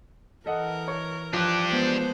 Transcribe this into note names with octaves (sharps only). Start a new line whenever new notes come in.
E3 A4 A#4 D#5 F#5
C#5
F3 D4 G4 F#6
G#3 B3 C5